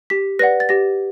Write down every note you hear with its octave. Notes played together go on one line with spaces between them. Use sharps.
G4 B6
B4 D5 F#5 A#6
A6
G4 A#6